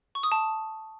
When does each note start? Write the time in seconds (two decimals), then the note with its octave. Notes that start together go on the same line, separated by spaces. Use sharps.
0.15 C#6
0.23 D#6
0.32 A5